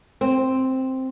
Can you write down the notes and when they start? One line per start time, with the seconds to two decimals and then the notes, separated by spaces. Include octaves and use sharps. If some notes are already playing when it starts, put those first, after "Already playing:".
0.21 C4